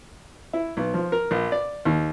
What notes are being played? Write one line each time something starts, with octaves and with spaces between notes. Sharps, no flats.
E4
B1
F3
A#4
A#1
D5
D#2